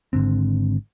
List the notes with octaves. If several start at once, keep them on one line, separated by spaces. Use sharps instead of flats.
G#1 G#2 D3 C4